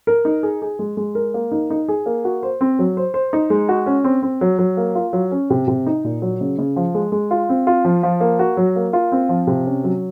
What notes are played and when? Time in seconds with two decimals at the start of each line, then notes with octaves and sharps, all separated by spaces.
0.07 A#4
0.25 D#4
0.43 G#4
0.62 G#4
0.79 G#3
0.97 G#3
1.15 A#4
1.34 A#3
1.52 D#4
1.70 D#4
1.89 G#4
2.06 A#3
2.25 F#4
2.43 C5
2.61 C4
2.79 F#3
2.97 C5
3.14 C5
3.33 D#4
3.50 G#3
3.69 F#4
3.86 C#4
4.04 C4
4.23 C4
4.41 F#3
4.59 F#3
4.77 A#3
4.95 F4
5.13 F#3
5.31 C#4
5.50 C3
5.68 C3
5.87 D#4
6.05 A#2
6.22 F#3
6.41 C#3
6.58 C#3
6.76 F3
6.95 G#3
7.12 G#3
7.31 F4
7.49 C4
7.67 F4
7.85 F3
8.03 F3
8.21 A#3
8.39 F#4
8.57 F#3
8.76 A#3
8.93 F4
9.12 C4
9.29 F3
9.47 C3
9.66 C#4
9.84 F#3